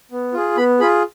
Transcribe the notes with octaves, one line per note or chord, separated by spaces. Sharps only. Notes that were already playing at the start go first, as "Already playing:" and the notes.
B3
F4 G#4
B3 B5
F4 G#4 B5